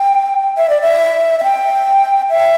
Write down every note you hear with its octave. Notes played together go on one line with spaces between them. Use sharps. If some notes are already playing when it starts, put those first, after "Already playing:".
Already playing: G5
E5
D5
E5
E5
G5
E5